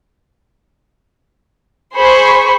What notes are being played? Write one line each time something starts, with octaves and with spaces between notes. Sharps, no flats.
G#4 C5 B5 C#6